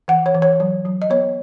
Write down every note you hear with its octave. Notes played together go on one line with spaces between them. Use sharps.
E3 F#5
C#5
E3
C#5
F#3
F#3
D#5
B3 C#5